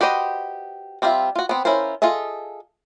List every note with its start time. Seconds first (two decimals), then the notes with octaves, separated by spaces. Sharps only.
0.01 F#4 G4 B4 C5 D#5
1.02 G3 C4 D4 F4 E5
1.36 F4 F#4
1.49 B3 C4
1.65 C#4 E4 F4 A#4 C5
2.02 F4 G#4 A4 D#5 E5